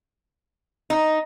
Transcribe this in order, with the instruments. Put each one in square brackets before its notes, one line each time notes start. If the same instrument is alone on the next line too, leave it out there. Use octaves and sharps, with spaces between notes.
[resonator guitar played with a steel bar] D#4